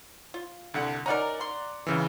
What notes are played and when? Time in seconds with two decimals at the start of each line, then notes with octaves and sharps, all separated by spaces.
0.34 F4
0.74 C2 D3 F#5
1.06 C#4 D#4 A#4 D5 F#5 A#5
1.41 C6
1.87 C#2 C#3 E3